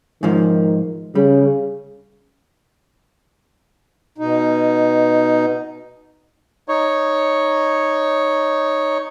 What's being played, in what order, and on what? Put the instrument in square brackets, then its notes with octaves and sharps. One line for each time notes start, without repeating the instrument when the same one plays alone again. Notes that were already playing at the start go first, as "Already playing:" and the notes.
[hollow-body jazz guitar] G#2 F3 [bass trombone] D#3
[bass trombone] C#3 [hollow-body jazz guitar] G3
[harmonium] B2 D#4
[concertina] D#4 C#5